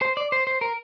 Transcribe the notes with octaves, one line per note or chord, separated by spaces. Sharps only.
C5
D5
C5
C5
A#4